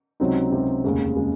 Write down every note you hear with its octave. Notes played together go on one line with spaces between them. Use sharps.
C#2 C3 F#3 C4 D#4
C#2 C3 F#3 C4 D#4
F1 D#2 C#3 G#3
C#3 G#3